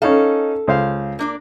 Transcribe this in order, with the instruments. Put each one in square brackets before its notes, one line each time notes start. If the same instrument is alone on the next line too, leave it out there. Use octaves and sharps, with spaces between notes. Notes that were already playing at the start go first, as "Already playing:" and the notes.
[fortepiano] C#4 D#4 F5 [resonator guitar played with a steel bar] A4
[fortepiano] C#2 C5 F5
[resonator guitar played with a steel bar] A#3 D4 D5